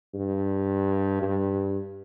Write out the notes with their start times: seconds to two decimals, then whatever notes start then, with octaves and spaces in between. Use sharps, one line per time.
0.14 G2
1.22 G2